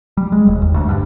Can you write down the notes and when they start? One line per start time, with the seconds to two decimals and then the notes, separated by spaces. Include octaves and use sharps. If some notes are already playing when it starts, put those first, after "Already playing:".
0.17 G3
0.32 G#3
0.48 E1
0.62 D#2
0.74 D2
0.89 G2